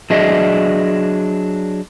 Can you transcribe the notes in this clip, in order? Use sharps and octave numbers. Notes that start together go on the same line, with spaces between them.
F#3 D4 G#4 D#5 E5